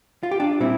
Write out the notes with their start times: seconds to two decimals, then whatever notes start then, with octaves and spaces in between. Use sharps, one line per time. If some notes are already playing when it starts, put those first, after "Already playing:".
0.23 F4
0.31 G4
0.40 D4 F4
0.60 A#2 G3 C4 E4